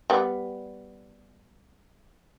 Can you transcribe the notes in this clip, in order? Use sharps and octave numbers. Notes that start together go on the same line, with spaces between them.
G3 B3